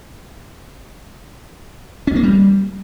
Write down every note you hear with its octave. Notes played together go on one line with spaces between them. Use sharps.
C#4
A#3
G3